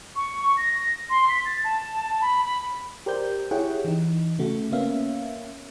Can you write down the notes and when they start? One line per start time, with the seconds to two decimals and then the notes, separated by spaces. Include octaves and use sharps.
0.16 C#6
0.57 A#6
1.10 C6
1.29 B6
1.45 A6
1.64 A5
2.22 B5
2.45 B5
3.06 G4 A#4 C5 D5 G6
3.51 E4 G4 G#4 C#5 F#5 G5
3.85 E3 D#4
4.39 C#3 A3 F#4
4.72 A#3 B3 C#4 E5 F5